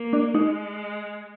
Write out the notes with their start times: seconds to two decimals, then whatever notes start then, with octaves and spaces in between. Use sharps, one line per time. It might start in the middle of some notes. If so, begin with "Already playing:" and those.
Already playing: A#3
0.13 D4
0.34 G#3 D#4